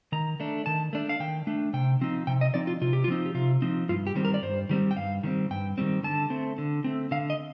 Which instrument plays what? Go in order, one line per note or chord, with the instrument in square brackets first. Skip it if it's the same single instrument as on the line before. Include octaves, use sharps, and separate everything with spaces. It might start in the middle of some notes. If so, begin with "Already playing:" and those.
[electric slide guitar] D#3 A#5
A3 D4
D#3 A5
A3 D4
F5
D#3 G5
A3 D4
C3 G5
F3 C4 D#4
C3 G5
D#5
F3 C4 D#4 D5
F4
C3 F4
G4
F4
F3 C4 D#4
G4
C3 F4
F3 C4 D#4
G2 F4
G4
D#3 G3 C4
A#4
D5
G2 C5
D#3 G3 C4
G5
G2 F5
D#3 G3 C4
G2 G5
D#3 G3 C4
D3 A5
A3 C4
D3
A3 C4
D3 F5
D#5